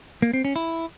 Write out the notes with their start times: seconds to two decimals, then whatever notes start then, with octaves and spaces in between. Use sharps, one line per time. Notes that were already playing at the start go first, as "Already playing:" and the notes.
0.22 A#3
0.33 C4
0.45 C#4
0.56 E4